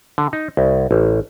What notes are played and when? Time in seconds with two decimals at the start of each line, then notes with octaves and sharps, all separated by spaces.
0.18 D3
0.33 D#4
0.57 C2
0.91 A1